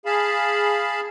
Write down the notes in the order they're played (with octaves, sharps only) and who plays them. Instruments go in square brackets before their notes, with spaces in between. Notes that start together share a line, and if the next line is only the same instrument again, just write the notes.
[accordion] G#4 F5 A5 B5